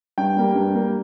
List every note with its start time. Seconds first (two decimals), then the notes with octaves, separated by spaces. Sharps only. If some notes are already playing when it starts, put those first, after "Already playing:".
0.18 G2 G5
0.37 G3 A#3
0.55 G2
0.74 G3 A#3